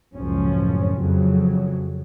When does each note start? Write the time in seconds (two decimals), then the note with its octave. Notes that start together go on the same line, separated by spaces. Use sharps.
0.15 F#1 C#2 F#2 A2 F3 C#4
0.96 F2 C#3 F#3